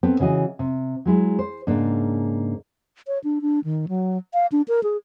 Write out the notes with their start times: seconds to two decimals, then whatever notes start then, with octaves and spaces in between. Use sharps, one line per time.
0.03 B3 C4 A4
0.20 C#3 E3 F#4 D#5
0.59 C3
1.05 F#3 G#3 E4
1.39 C5
1.67 G#2 C#3 A#3 D4
3.07 C#5
3.24 D4
3.42 D4
3.64 D#3
3.88 F#3
4.34 F5
4.52 D4
4.68 A#4
4.83 G#4